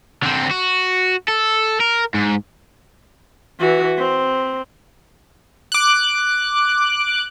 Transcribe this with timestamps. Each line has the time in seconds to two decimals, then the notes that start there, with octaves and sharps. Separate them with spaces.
0.23 D3 C4
0.51 F#4
1.28 A4
1.80 A#4
2.14 G#2
3.59 E3 F#4
3.98 C4
5.72 D6 F#6